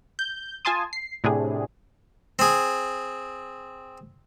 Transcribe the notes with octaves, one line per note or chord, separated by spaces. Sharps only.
G6
F4 G#5 A5 C6 D#6
C7
A2 C3 D4 G#4
C4 G#4